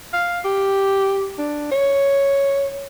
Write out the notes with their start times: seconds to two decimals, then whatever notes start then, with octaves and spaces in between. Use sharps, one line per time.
0.13 F5
0.45 G4
1.38 D4
1.72 C#5